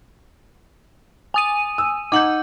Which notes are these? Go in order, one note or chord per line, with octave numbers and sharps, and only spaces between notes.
G#5 D#6 D#7
E6
D#4 F#5 D6 G6 F#7